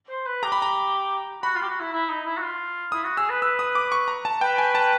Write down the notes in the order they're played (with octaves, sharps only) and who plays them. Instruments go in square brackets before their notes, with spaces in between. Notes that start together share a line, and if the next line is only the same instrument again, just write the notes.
[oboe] C5
B4
[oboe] G4 [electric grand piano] A#5
[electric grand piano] B5
A#5
[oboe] F#4 [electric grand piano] B5
[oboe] F4
G4
F#4
E4
E4
D#4
E4
F#4
F4
[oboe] E4 [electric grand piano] D#6
[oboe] F#4
[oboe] G#4 [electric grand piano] E6
[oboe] B4
[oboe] B4 [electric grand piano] E6
[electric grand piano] D#6
D6
C#6
A#5
A5
[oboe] B4 [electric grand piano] G5
[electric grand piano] G#5
A5